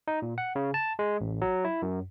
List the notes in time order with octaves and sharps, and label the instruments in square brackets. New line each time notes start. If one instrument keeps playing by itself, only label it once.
[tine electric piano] D#4
A#2
F#5
C#3
A5
G#3
A1
F#3
E4
F#2